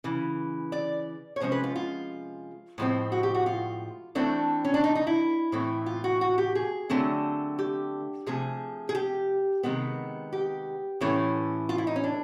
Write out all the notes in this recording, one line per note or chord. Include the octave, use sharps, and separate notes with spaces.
C#3 E3
D5
C#5
C3 F3 G#3 C#4 C5
B4
F4
F4
A2 F3 G#3 C4
F#4
G4
F#4
F4
E3 A3 C4 D4
C#4
D4
D#4
D#4
E4
A2 E3 A3 C4
F4
F#4
F#4
G4
G#4
D3 F#3 A3 C4
G4
C3 F3 A3 G#4
G#4
G4
C3 D#3 G#3 B3
G4
A2 E3 A3 C#4
F4
E4
D#4
C#4
D4